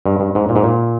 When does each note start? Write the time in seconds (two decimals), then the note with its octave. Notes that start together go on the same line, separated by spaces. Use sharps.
0.06 G2
0.20 G2
0.35 G#2
0.49 A#2
0.56 G#2
0.63 A#2